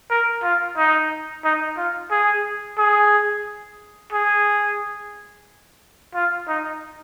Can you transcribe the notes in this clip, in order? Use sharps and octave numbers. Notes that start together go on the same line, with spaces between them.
A#4
F4
D#4
D#4
F4
G#4
G#4
G#4
F4
D#4